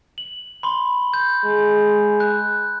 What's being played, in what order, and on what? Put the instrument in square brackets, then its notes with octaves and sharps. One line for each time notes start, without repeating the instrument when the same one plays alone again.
[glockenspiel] F#7
B5 C6
G6
[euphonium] G#3
[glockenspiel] F#6